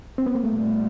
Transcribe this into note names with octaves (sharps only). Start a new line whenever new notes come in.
C4
B3
A#3
A#2 G3 A3 B3